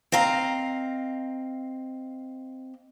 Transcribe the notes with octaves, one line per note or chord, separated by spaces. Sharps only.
C4 D#5 F5 A#5